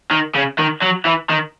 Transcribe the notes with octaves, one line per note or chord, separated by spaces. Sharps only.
D#3
C#3
D#3
F#3
E3
D#3